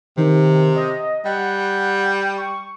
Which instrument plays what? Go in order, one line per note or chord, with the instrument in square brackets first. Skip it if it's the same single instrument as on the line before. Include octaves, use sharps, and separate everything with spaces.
[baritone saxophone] C3 [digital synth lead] D#3
[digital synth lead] D#5
[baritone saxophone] G3 [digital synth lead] F#5
[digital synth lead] C#6